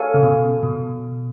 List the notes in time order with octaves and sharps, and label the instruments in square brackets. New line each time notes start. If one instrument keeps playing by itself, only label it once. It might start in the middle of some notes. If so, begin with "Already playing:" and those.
Already playing: [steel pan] A4 C#5 F5 G#5
[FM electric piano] C#3
B2
B2